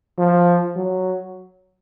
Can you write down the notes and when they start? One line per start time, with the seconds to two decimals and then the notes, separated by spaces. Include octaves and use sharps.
0.18 F3
0.76 F#3